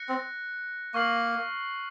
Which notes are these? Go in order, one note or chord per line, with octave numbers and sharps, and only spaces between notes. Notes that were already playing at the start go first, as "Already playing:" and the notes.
Already playing: F#6 A#6 C#7
C4
A#3 C#6 F6 C7 F#7